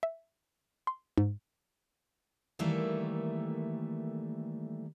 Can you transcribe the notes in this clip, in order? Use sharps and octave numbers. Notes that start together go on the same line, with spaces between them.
E5
C6
G#2
D#3 E3 G3 A3 A#3 A4